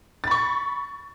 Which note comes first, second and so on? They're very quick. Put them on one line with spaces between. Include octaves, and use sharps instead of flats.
A6 B5 C#6